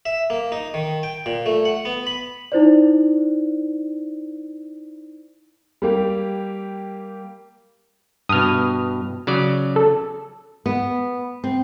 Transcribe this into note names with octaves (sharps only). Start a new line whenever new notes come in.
E5
A#3
D#4
D#3
G5
A#2
A3
F#5
B3
B5
D#4 E4 C5 D5
G3 A#3 G4
G2 B2 D#6 F6
C#3 F#3 D5
A4
B3
C4